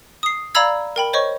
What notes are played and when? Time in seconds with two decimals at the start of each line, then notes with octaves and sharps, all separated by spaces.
0.23 D#6 C7
0.55 D5 F5 A#5 B5 E6 G#6
0.96 A#4 G5 B5
1.13 C5 C#5 D#5 C#6